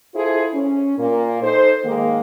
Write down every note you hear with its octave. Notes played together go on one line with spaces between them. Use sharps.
E4 F4 G#4 A4 C5
C#4
A#2 A#3
D#4 A4 C5
D#3 G#3 A#3